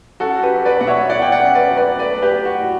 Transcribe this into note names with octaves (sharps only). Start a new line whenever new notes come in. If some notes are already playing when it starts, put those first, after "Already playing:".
C#4 F#4 A4
G4 B4
F#3
B4 D5
B2 F#5
C#5 E5
E4 D5 F#5
G5
D5 F#5
C#4
B4 D5
F#3
B4 D5
A3 B4 D5
G4 B4
F#3
F#4
A2